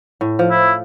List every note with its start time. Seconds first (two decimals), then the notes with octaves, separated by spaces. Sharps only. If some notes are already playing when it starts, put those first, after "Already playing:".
0.21 A2
0.39 F3
0.51 E4